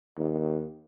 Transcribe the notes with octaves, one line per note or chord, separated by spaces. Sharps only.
D#2